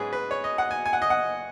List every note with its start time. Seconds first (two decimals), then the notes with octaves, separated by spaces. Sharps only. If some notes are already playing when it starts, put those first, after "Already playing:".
Already playing: G#2 F#3 C#4 G#4 B4
0.13 B4
0.31 C#5
0.44 D#5
0.58 F#5
0.71 G#5
0.86 G#5
0.93 F#5
1.02 D#5
1.10 F#5